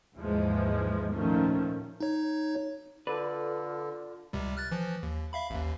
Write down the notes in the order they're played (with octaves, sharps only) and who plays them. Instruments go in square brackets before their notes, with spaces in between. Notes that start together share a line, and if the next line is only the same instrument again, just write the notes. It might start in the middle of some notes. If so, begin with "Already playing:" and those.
[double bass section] D#2 G#2 E3 F3 G#3
A#2 D#3 F3 A3 C#4
[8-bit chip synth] D#4 C#5
[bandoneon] D3 [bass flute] F4 [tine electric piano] A4 D5 [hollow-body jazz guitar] B4
[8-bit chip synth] C#2 C3 G3
F6 F#6 A6
E3 F3
D#2
E5 F5 B5
A1 D#2